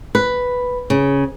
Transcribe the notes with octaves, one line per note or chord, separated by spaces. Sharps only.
B4
C#3